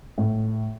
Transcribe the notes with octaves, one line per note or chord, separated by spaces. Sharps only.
A2